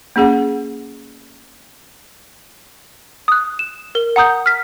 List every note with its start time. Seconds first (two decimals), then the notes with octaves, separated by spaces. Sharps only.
0.16 A#3 C#4 G#4 F#5
3.28 D#6 F#6
3.59 E7
3.95 A#4 G7
4.16 F#5 A#5 D#6 G6
4.46 F6 B6